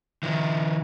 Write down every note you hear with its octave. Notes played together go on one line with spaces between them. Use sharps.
D#3 F3